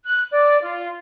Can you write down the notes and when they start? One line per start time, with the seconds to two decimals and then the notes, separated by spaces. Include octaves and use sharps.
0.05 F#6
0.32 D5
0.62 F4